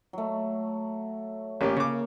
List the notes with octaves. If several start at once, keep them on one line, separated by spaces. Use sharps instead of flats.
F#3 A3
A1 A#3 C#4 G4
C#3 C#5 D6